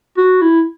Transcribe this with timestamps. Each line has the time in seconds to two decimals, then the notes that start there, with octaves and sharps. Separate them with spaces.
0.18 F#4
0.41 E4